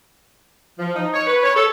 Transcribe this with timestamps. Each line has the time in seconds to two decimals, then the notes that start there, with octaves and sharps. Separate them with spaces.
0.79 F3
0.96 D#4
1.14 C#5
1.27 B4
1.44 C#5
1.56 A4